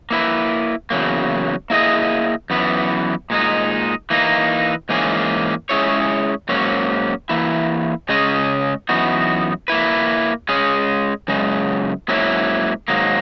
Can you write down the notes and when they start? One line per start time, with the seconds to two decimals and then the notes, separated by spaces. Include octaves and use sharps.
0.10 A#3 E4 B4
0.90 E2 C#3 F#3 A#3
1.70 A#3 E4 G#4 D#5
2.50 F#2 E3 B3
3.30 A#2 G#3 D#4
4.10 E3 A#3 D#4
4.89 G#2 E3 A#3 C#4 G#4
5.69 G#3 C#4 E4 G#4 C#5
6.49 G#2 F#3 A#3 C#4
7.29 E3 A#3 E4
8.09 C#3 G#3 C#4 G#4 D#5
8.89 F#2 E3 B3 D#4 F#4
9.68 A#3 E4 B4
10.49 G#3 C#4 G#4
11.28 F#2 C#3 G#3
12.08 G#2 F#3 A#3 C#4 E4
12.88 G#2 D#3 F#3 A#3